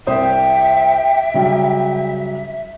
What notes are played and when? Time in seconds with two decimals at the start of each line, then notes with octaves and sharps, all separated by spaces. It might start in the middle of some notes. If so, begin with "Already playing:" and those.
0.07 C2 C5 E5 G5 D#6
1.34 C#3 F#3 G3